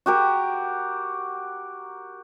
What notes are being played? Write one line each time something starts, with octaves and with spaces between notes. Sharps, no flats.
F#4 G4 A#4